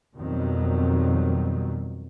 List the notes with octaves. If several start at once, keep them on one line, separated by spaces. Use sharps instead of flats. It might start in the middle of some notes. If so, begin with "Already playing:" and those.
F2 B2 D#3 F#3 G3